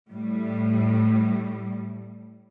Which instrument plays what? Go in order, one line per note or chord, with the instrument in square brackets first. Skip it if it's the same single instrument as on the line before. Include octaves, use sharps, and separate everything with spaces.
[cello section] A2 G3